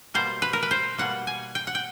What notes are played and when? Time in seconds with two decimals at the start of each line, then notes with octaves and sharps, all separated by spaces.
0.14 B2 G3 A#3 C5
0.42 B4
0.53 A#4
0.63 B4
0.71 C5
0.98 B2 G3 A#3 F#5
1.27 G#5
1.55 G5
1.67 F#5
1.75 G5